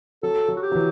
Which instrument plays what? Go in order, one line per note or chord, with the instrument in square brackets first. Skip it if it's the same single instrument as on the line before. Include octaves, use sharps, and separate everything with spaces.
[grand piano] F#3 [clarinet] A4
[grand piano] F#3
[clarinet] F#4
G4
[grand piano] F#3
E3